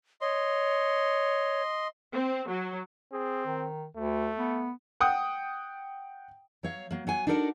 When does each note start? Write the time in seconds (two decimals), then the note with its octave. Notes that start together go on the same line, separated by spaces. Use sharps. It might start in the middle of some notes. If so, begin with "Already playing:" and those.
0.21 C#5 D#5 C6
2.13 C4
2.49 F#3
3.13 C4 G#4
3.46 D#3
3.96 D2 A3
4.37 B3
5.00 F#5 G5 D#6
6.63 F#3 C#5 F5
6.91 F#3 A#3
7.07 F#3 F#5 G#5
7.27 D4 D#4 F#4 A4 A#4 D5